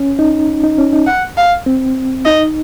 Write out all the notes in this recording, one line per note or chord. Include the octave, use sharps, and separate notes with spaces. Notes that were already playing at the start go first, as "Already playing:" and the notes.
Already playing: C#4
D#4
D#4
C#4
D#4
F#5
F5
C4
D#4 D#5